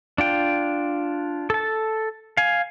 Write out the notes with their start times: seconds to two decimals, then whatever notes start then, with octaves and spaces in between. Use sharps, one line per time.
0.18 D4 F4 G5
1.50 A4 A5
2.37 F5 G#5